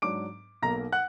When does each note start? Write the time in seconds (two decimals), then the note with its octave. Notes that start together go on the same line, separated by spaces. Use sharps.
0.02 G#2 F#3 D4 D6 D7
0.62 B1 B2 A#3 A#5 A#6
0.92 F#5 F#6